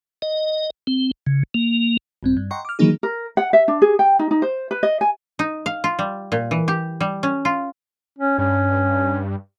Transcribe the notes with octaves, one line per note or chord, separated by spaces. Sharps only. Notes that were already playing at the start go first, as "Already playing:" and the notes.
D#5
C4
C#3
A#3
A#1 G2 C4
G2
D#5 F#5 G5 A#5 C6 C#6
D6 F6
D#3 E3 F#3 A#3 D#4 G#4
A#4
F#5
E5
D4
G#4
G5
D#4
D#4
C5
B4
D#5
G#5
D#4
F5
F4
G3
A#2
E3
G4
G3
C#4
F4
C#4
G2 C#4